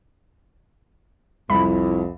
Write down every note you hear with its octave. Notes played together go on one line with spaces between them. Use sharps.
C2 F2 E4 B5